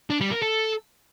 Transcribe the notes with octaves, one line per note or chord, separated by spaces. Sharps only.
D4
G3
A#4
A4